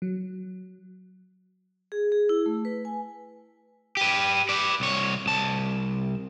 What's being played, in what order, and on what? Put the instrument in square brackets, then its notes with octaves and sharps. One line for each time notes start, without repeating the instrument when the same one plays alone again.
[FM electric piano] F#3
[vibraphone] G#4
G#4
E4
A3
B4
G#5
[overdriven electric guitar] G4 B4
B4 D5
C2 C#5
C2 A5